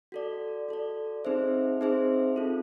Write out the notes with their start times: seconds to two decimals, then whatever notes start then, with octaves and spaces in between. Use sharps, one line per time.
0.12 F#4 A4 D5
0.69 F#4 A4 D5
1.25 C4 D#4 G#4 C5 E5
1.81 C4 D#4 G#4 C5 E5
2.36 C4 F4 A4